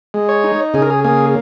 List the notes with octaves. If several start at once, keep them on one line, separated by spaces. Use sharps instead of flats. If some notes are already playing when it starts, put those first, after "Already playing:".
G#3
C#5
D#4
C#3 G#4
A#4
G#4
A#3 G#4